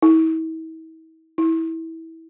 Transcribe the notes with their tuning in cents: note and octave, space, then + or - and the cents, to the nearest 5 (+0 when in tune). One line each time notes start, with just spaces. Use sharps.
E4 -40
E4 -20